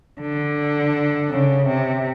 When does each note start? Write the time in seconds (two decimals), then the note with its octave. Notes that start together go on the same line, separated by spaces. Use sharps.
0.21 D3
1.30 C#3
1.67 C3